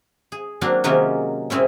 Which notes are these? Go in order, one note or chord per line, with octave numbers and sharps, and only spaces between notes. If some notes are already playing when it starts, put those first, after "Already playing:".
G#4
F#3 A#3 C4 D4 F#4 F5
C3 D#3 F#3 G#3 A#3 C#4
A#2 G#3 C4 C#4 E4